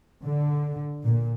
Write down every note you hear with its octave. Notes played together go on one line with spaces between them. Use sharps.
D3
A#2